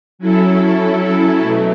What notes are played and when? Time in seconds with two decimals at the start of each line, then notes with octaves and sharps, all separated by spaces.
0.19 F#3 C#4 E4 A4
1.40 B2 F#3 A3